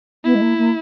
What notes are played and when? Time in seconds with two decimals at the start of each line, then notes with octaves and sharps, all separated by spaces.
0.24 B3 E4
0.34 G#3
0.41 A#3
0.57 A#3